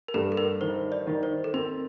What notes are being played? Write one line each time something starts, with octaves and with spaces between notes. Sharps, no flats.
A#4
G2 A4
A4
A#4
D#3 C5
D5
D#3
C5
A4
C4 A#4